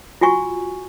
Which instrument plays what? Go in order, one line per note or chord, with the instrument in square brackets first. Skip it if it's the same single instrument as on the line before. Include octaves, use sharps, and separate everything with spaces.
[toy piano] F4 F#4 G#5 C#6